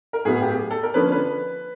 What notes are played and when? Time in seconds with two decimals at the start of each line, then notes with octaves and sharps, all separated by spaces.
0.13 A#4
0.25 A2 F#3 B3 G#4
0.42 G4
0.70 A4
0.83 A#4
0.94 D3 F3 A#3 C#4 B4
1.12 B4